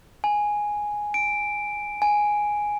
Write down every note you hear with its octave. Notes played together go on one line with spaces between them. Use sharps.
G#5
D7
G#5